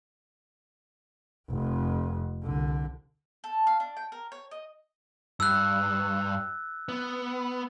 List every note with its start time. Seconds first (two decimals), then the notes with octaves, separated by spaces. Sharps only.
1.50 F1 F2
2.44 C2 D3
3.44 A4
3.67 F5
3.80 D4
3.97 G5
4.12 A#4
4.32 C#5
4.51 D#5
5.40 G2 E6 F#6
6.89 B3